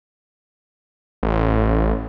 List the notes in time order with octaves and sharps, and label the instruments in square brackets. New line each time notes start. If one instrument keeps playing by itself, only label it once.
[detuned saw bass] A1